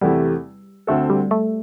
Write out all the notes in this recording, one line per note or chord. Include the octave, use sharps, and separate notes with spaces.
E2 C3 G3 A3 E4 G4
D2 D3 A3 C4 A4
G3
A3